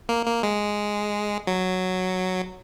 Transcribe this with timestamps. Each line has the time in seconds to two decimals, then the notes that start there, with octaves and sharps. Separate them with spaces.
0.09 A#3
0.26 A#3
0.43 G#3
1.47 F#3